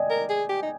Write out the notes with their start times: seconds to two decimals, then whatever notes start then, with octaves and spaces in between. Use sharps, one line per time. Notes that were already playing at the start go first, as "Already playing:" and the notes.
Already playing: D5 D#5 G5 G#5
0.10 A#4
0.30 G#4
0.49 G4
0.63 D#4